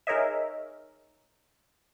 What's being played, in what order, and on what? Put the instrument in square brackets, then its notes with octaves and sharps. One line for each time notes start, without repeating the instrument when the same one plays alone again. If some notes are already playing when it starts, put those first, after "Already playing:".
[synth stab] D#4 G#4 A#4 C#5 D#5 E5